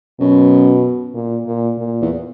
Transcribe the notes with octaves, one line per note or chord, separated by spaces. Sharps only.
F#2 B2
A#2
A#2
A#2
E2